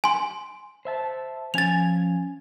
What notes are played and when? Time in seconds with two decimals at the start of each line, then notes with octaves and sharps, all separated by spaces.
0.04 G#5 C6
0.85 C5 E5 A5
1.54 F3 C#4 G#5 A6 F7